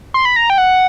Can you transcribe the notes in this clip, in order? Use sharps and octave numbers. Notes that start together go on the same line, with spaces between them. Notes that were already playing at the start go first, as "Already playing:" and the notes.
C6
B5
A#5
G5
F#5